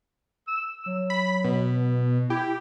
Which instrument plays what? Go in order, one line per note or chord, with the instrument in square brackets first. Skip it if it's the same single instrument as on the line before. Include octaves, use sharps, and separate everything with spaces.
[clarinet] E6
F#3
[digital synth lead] B5
B2
[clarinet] E4 [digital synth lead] G4